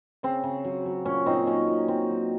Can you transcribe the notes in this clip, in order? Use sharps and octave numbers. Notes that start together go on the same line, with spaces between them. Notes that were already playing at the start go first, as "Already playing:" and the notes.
C#3 C4
C#3
F#3
F#3
A#2 C#4
A#2 C4 D#4
F#3 C#4
A#2
F#3 C4
F#3